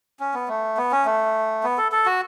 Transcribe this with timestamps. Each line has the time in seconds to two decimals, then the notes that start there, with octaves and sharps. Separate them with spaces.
0.20 C#4
0.34 B3
0.48 A3
0.77 B3
0.92 C#4
1.05 A3
1.63 B3
1.78 A4
1.92 A4
2.06 F#4